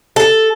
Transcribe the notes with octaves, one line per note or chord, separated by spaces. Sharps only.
A4